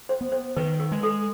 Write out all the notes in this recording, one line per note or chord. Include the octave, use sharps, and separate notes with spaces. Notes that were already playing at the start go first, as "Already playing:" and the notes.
C5
B3
C5
D#3 B4
A#4
G#3
A4